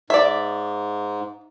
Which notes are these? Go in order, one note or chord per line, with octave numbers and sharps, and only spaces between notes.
G#2 D5 E5